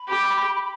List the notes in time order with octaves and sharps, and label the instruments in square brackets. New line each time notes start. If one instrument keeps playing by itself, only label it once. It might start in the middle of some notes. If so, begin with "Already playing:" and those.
Already playing: [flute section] B5
[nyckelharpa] G4